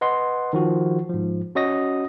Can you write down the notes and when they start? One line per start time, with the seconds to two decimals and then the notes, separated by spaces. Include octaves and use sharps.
0.01 B4 D#5 F#5 C6
0.53 D#3 F3 F#4
1.09 G#2 F3
1.55 C#4 F#4 C#5 D#5 D#6 A#6